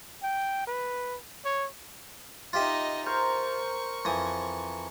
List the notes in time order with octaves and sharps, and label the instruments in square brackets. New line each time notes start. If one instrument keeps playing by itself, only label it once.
[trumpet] G5
B4
C#5
[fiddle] D#4 D#5 [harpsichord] F4 G4 E5
[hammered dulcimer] A#4 C5 A#5 [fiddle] C#6
[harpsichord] F2 E3 D#6